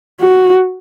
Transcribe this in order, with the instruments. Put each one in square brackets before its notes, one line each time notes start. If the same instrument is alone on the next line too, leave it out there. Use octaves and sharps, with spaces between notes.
[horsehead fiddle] F#4